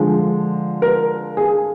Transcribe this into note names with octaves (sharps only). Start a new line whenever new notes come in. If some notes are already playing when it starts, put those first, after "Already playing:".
Already playing: D3 F3 G#3
A#4
G#4